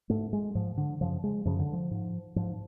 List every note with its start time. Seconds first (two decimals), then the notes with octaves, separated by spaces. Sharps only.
0.10 G#2 A3
0.33 G#3
0.55 G#2 F3
0.77 D3
1.01 F#2 C#3 F3
1.24 G#3
1.45 F#2 C#3 F3
1.59 D3
1.73 F3
1.91 G#2
2.36 G#2 F3